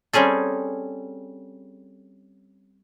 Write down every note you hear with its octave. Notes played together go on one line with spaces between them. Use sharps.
G3 C4 C#4 G#4 A4